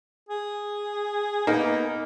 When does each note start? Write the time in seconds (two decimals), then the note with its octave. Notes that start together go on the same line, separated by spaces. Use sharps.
0.29 G#4
1.47 A#3 B3 D#4